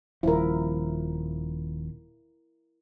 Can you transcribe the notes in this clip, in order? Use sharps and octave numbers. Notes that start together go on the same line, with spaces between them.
D#1 F3 E4 A#4